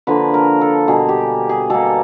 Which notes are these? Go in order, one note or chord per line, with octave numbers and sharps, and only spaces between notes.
D3 F3 A#3 B4
A#4
A4
B2 G3 A#3 G#4
G4
G#4
B2 G3 A#3 A4